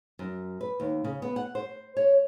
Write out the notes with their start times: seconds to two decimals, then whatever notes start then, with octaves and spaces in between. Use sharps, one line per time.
0.19 F#2
0.61 B4
0.80 D#2
1.04 C#3
1.22 B3
1.36 F#5
1.55 C5
1.97 C#5